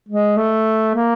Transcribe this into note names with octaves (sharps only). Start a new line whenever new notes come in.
G#3
A3
A#3